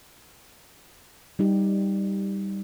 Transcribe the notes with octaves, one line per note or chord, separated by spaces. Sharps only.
G3 D#4 G4